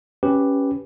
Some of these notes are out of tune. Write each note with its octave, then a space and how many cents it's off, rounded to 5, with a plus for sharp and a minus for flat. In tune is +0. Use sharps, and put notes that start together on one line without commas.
C#4 +0 G4 +0 B4 +0